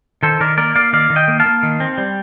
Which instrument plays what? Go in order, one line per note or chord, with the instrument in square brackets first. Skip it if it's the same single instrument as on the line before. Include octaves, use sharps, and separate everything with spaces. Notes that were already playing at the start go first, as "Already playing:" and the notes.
[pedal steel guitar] D#3 A4 C5
D#3 A#4 D5
A#3 A#4 D5
A#3 D5 F5
D#3 D5 F5
D#3
D#5 G5
A#3
F5 A5
A#3
D#3
C4
G3